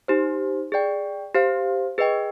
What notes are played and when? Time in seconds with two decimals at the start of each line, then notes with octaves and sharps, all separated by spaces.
0.08 D#4 G4 C5
0.72 G#4 D5 G5
1.34 G4 C5 F5
1.98 G#4 B4 D#5 G5